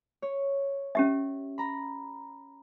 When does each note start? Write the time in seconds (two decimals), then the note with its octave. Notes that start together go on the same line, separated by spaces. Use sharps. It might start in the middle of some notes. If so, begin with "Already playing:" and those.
0.22 C#5
0.95 C#4 G4 E5
1.58 A#5 B5